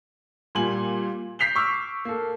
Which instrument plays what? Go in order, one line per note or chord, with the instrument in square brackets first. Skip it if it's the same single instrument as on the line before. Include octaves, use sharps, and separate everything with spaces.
[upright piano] A#2 G3 G#5 F#7
G6 B6 C7 F7 G7
C#6 D6 E6 F6
A#3 A4